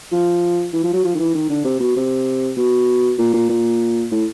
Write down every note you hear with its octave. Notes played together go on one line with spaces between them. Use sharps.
F3
E3
F3
F#3
F3
D#3
E3
D#3
D3
C3
B2
C3
B2
A#2
A#2
A#2
A2